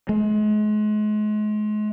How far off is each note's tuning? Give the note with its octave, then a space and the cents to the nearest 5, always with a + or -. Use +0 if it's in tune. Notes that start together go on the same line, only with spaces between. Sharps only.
G#3 +35